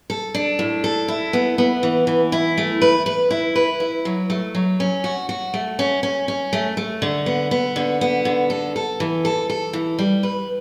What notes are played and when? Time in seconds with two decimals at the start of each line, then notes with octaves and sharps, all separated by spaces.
0.10 A4
0.34 D4
0.59 A2
0.84 A4
1.08 E4
1.33 B3
1.58 B3
1.83 E3
2.07 E3
2.32 E4
2.58 A3
2.81 B4
3.06 B4
3.30 E4
3.56 B4
3.80 E4
4.05 F#3
4.30 A3
4.55 F#3
4.80 C#4
5.04 F#4
5.29 F#4
5.54 A3
5.79 C#4
6.03 C#4
6.28 C#4
6.53 A3
6.77 A3
7.02 D3
7.26 B3
7.51 B3
7.76 D3
8.01 B3
8.25 D3
8.50 A4
8.76 A4
9.00 E3
9.25 A4
9.50 A4
9.73 E3
9.98 G3
10.23 B4